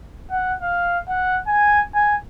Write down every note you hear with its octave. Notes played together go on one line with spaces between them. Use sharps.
F#5
F5
F#5
G#5
G#5